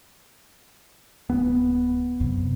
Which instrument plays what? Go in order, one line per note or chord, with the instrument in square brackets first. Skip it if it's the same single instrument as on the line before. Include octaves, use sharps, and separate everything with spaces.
[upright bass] D1 [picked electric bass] B3
[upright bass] F#2 C3